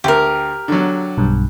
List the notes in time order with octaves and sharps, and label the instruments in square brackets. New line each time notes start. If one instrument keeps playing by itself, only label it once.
[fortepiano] D2 [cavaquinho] G4 A#4
[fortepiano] D3 F#3
[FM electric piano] B1 G2